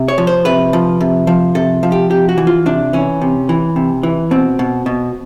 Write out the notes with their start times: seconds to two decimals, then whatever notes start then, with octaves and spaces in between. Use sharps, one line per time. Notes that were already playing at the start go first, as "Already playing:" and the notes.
Already playing: C3
0.08 C#5
0.18 F3
0.27 C5
0.45 C3 B4
0.73 F3
1.01 C3
1.27 F3
1.55 C3 A4
1.83 F3
1.92 G4
2.10 C3 G4
2.29 F#4
2.38 E3
2.47 F4
2.66 C3 D4
2.93 E3 C#4
3.22 C3
3.49 E3
3.76 C3
4.03 E3
4.31 B2 C4
4.59 B2
4.86 B2